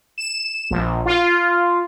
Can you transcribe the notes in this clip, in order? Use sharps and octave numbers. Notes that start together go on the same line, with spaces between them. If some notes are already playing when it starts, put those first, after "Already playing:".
E7
A#1
F4